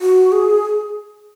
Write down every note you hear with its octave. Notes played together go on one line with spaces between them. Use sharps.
F#4
G#4